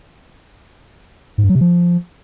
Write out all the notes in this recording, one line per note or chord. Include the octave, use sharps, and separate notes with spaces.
G#2
G2
F#3
C3
F3